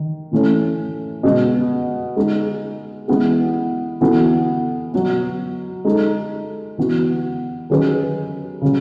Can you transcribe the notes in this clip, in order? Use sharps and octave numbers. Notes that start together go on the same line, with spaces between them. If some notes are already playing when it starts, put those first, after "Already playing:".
Already playing: D#3
A2 E3 A3 C#4
B2 G#3 B3
G#3 D#4 G#4
E3 G#3 B3 E4 G#4
E3 B3 F#4 A4
B2 F#3 B3
G#3 D#4 A4
E3 B3 F#4
D#3 F#3 C#4 G#4 B4
C#3 F#3 C#4